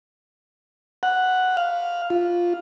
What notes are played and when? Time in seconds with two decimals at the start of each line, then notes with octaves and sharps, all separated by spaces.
1.03 F#5
1.57 F5
2.10 F4